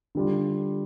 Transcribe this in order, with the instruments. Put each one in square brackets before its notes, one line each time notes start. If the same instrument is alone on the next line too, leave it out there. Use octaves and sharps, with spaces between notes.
[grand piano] D3 G3 D4 F4